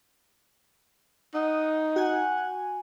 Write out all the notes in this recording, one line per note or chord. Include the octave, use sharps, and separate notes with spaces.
D#4 F#5 D#6
F#4 F#5 G#5